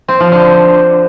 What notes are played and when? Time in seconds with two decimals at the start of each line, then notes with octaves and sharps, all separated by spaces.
0.08 C4
0.20 F3
0.32 D3